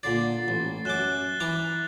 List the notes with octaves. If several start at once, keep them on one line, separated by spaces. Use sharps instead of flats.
A#2 D3 D5 A6 C7
A1
F#2 D6 F#6 E7 G7
E3 A#5 D6